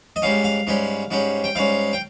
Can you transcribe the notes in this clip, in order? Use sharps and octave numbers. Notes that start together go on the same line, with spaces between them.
D#5
G#2 G3 C#4 F5
F5
G#2 G3 C#4
G#2 G3 C#4
G5
G#2 G3 C#4 F5
G5